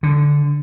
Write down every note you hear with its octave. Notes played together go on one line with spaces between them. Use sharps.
D3